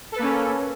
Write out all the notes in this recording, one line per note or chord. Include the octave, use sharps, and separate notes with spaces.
A#3 C#4 A4 B4